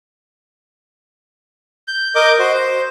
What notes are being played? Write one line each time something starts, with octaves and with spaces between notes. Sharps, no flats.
G6
A#4 D#5 D6 G6
F#4 C5 D#5
C5